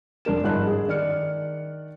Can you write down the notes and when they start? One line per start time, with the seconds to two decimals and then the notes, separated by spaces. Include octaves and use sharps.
0.25 F1 D4 A#4 E7
0.43 G1 G#2 E4 A5 F#6
0.66 G#4
0.88 D#3 D5 F6 C#7